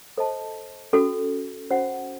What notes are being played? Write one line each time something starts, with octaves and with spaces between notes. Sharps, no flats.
A4 C5 D#5 A5
C#4 F#4 A4
C#4 F#4 C5 F#5